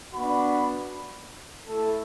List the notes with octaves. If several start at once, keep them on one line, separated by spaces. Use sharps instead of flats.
B3 D4 F#4 B5
A3 E4 A4